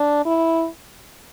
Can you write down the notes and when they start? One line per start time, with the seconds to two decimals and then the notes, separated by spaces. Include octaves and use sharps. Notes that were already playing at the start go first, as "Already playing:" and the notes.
Already playing: D4
0.26 E4